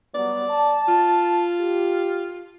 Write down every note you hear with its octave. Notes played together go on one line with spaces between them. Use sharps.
F#3 G3 B3 D5
A5
F4
G4